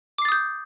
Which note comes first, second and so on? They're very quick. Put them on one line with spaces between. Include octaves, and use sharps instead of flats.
D6 C7 A6 D#6 G6